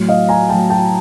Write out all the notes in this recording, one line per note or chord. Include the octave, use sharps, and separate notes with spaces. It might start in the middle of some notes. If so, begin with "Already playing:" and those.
Already playing: A2 F#3
D#5 F5
G#5 A#5
A2 F#3 G5 A5
G5 A5